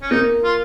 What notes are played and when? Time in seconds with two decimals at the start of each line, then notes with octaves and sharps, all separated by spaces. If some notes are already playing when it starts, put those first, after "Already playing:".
0.02 C#4
0.11 A#3 D#4
0.44 F4